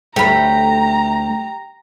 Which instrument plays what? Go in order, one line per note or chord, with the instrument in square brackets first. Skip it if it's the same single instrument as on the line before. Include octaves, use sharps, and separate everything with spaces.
[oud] D2 A3 C#5 [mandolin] G4 B5 [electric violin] A#5